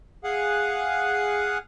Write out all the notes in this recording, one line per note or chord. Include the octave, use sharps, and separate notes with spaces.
G#4 F5 F#5